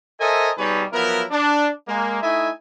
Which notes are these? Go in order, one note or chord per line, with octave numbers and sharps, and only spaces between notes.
A4 A#4 C5 D#5 E5 G#5
B2 G3 D#4 G#4 B4 C#5
F3 F#3 B3 E4 A#4
D4
G#3 A#3
A3 D#4 E4 D#5 E5 G#5